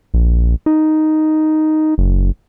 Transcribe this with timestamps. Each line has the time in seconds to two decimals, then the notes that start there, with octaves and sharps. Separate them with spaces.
0.14 A#1
0.66 D#4
1.98 F#1